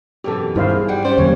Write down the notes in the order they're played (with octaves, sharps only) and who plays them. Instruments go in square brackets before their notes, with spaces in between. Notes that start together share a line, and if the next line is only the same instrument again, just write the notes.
[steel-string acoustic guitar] F#2 B2 E3 [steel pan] G4 A4
[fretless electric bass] G2 [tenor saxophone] D#3 [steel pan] E4 C5 F5
[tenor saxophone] G#4
[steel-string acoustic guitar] G3 F#5 G5
[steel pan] C#4 [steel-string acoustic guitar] G4 D5 [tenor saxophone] C5
[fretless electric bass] F2 D3 F#3 [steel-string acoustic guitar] G3 [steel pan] A#3 C#5